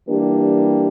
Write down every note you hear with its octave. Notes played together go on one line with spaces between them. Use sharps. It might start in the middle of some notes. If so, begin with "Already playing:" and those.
E3 G3 A#3 D4 G4